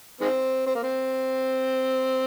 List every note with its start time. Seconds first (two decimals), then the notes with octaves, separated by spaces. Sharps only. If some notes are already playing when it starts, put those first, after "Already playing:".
0.21 D#3 G#3 C4
0.67 C4
0.75 A#3
0.83 C4